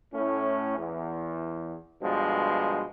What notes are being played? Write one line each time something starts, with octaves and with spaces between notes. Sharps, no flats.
A2 C#4
E2
G2 B2 F3 G#3